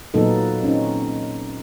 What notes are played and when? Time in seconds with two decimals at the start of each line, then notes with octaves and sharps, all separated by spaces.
0.14 A#2 F#3 A#3 B3 D#4 A4
0.63 C4 C#4 D#4